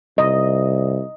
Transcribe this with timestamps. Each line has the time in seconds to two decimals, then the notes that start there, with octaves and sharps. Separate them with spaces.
0.18 C2 D#5